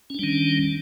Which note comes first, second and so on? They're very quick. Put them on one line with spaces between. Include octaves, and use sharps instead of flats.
C#4 D4 G3 D#3